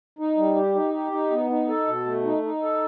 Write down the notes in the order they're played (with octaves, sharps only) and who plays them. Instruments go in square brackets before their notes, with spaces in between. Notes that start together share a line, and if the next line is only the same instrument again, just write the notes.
[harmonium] D#4
G3
G4
D#4
G4
D#4
B3
D#4
A4
B2
A3
D#4
D#4
A4